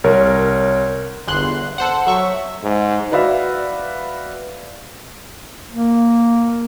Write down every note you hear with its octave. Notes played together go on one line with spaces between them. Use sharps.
C2 A#4 C#5
G1 E2 C6 F#6
A4 C5 F#5
F#3 E5 C#6
G#2
F#4 B4 D5 E5 F5
A#3